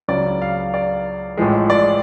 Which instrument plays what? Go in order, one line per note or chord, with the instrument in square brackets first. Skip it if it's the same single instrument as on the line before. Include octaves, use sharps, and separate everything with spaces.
[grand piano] C#2 C#3 F#3 D5
F5
D5
A1 A2 F3 G#3
D5